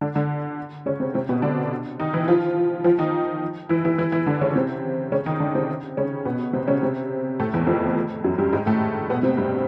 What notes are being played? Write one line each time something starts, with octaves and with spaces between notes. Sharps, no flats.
D3 D4
D3 D4
C#3 C#4
C3 C4
C3 C4
B2 B3
D3 D4
D#3 D#4
E3 E4
F3 F4
F3 F4
D#3 D#4
E3 E4
E3 E4
E3 E4
E3 E4
D3 D4
C#3 C#4
C3 C4
C#3 C#4
D#3 D#4
D3 D4
C3 C4
C#3 C#4
B2 B3
C3 C4
C#3 C#4
C3 C4
A2 A3
E2 E3
F2 F3
F#2 F#3
G2 G3
G#2 G#3
A2 A3
B2 B3
C3 C4
G2 G3